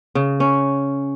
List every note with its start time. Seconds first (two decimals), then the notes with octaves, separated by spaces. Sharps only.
0.15 C#3
0.40 C#4